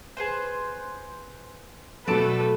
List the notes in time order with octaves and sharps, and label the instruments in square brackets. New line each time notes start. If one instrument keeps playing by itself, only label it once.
[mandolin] G#4 B4 C5
[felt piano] B2 F#3 [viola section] A3 A4 B4 [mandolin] D5 A5 D6